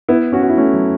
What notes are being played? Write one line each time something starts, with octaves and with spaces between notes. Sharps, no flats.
B3 E4
C#4 F#4
F#4
E4
A3 C#4
F#3